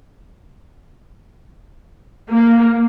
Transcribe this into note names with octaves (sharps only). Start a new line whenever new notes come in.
A#3